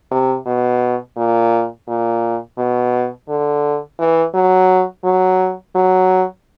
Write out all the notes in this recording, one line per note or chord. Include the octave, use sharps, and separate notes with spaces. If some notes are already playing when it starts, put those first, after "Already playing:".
C3
B2
A#2
A#2
B2
D3
E3
F#3
F#3
F#3